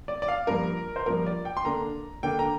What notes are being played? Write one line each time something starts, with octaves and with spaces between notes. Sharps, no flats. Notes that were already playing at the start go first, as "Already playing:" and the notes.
D5
D5
F5
G2 F3 A#3 A#4
C5
G2 F3 A#3 A#4
D5
G5
C6
D3 A#3 D4 A#5
D3 A#3 D4 G5
A#5